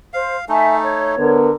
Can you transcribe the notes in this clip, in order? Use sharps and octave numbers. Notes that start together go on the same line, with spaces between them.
C5 F5
A3 D#4 A4 E5 G#5
C#5
D3 B3 A#4